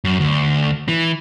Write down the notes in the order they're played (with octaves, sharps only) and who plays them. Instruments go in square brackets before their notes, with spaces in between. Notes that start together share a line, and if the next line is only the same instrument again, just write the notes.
[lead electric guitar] F#2
D2
E3